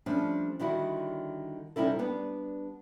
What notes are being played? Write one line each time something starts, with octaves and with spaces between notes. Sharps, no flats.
F3 G3 A3 C#4 D4
D3 D#3 G3 E4 F#4
C3 G3 C#4 D#4 E4 A4
G3 B3 D4